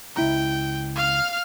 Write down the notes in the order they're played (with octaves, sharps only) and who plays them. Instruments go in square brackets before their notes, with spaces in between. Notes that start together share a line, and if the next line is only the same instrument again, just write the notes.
[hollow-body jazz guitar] C#2 E4 A#5 [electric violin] G5
[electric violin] F5 F6